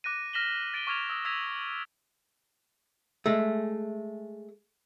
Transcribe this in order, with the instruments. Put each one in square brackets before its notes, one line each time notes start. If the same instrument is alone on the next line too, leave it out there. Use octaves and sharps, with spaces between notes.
[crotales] D6 F#6 A#6 D#7
F6 A#6 B6 E7 F#7 G7
A6 D7 D#7 G7
C#6 D6 F6 G#6 B6 F7
D#6 E6
E6 G#6 A#6 B6 F7 F#7
[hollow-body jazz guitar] G#3 A3